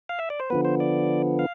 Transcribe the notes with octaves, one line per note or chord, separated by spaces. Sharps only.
F5
E5
D5
C5
D3 F3 B3 B4
C5
D5
F5